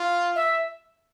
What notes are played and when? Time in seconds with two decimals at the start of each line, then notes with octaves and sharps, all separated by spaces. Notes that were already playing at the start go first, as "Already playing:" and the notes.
Already playing: F4
0.35 E5